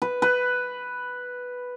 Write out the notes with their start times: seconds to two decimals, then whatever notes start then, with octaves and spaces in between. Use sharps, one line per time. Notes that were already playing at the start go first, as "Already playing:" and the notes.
0.02 B4
0.22 B4